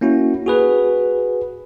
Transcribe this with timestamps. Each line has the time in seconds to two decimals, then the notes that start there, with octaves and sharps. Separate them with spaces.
0.01 A#3 C#4 E4 F#4
0.46 F#4 G#4 B4